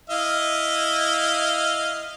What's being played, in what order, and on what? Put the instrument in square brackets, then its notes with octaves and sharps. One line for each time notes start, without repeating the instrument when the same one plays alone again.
[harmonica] E4 D#5 F5